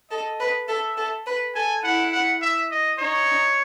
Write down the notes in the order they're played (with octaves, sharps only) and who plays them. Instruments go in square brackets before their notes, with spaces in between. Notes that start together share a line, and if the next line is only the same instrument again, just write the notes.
[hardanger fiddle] A4 [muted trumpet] D#5
[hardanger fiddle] B4
[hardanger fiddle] A4 [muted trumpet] E5
[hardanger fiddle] A4
B4
[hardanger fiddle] A4 [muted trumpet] G#5
[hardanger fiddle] E4 [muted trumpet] F#5
[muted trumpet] F#5
E5
D#5
[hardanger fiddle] D#4 [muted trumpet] C#5